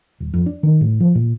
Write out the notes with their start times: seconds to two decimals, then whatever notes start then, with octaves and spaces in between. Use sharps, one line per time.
0.20 D#1
0.34 F2
0.46 D4
0.63 D#3
0.81 A2
1.00 F3
1.15 A#2